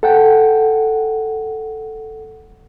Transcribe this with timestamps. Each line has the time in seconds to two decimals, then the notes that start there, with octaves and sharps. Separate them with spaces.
0.03 A4 F#5 G5